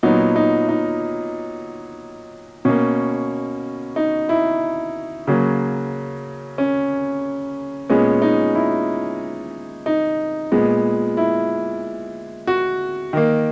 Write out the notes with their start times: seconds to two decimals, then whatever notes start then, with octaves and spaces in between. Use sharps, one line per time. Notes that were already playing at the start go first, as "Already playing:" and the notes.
0.03 A#2 F#3 B3 D#4
0.36 D#4
0.69 D#4
2.65 B2 A#3 C#4
3.96 D#4
4.29 E4
5.27 C#3 F#3 A#3
6.58 C#4
7.89 A#2 G#3 B3 C#4
8.22 D#4
8.55 E4
9.86 D#4
10.52 A#2 G#3 B3
11.17 E4
12.47 F#4
13.13 D#3 A#3